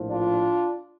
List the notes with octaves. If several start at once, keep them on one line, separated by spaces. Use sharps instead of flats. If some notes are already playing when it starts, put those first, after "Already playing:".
Already playing: A#1 A2 F3
D4 F4